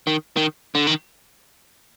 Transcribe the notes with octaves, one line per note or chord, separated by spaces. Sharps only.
D#3
D#3
D3
D#3